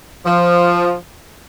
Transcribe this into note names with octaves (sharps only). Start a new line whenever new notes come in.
F3